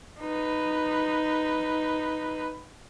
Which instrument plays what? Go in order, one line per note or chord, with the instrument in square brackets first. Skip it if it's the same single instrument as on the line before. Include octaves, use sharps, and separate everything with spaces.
[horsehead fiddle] D#4 B4